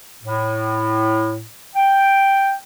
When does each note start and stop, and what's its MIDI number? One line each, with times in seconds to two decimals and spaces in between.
0.23 1.45 45
1.76 2.53 79